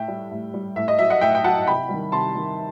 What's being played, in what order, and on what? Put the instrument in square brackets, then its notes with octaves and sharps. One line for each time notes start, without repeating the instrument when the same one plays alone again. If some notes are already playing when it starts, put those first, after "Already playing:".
Already playing: [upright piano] A2 E5 G5
G3
A2
G3
A2 E5
D#5
F#3 E5
D#5 F#5
A2 E5 G5
G5
F#3 F#5 A5
C3 G5 B5
D#3 G3
C3 A5 C6
D#3 G3